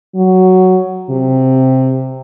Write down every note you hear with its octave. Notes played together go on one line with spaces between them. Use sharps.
F#3
C3